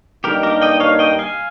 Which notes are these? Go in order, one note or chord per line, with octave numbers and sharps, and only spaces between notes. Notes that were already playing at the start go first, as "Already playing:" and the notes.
G2 G3 A#3 D#4 G4 A#4
G4 A#4
D#5 G5
C#5 F5
D#5 G5
F5 G#5